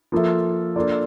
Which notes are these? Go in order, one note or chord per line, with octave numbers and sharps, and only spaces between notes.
F3 A#3 F4 A4 E5
A#3 D4 F4 A4 D5